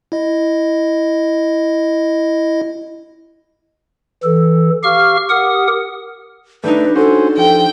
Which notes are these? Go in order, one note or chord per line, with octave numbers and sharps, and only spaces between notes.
E4 D#5
E3 A4
G4 F5 C#6 F6
G4 A#4 F#5 D#6
G3 A3 D4 D#4 B4
C#4 F#4 A4 C5
F3 G5